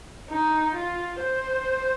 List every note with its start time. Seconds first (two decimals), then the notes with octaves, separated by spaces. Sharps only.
0.30 D#4
0.75 F4
1.20 C5